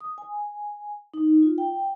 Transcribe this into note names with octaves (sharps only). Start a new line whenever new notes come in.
D#6
G#5
D#4
F4
G5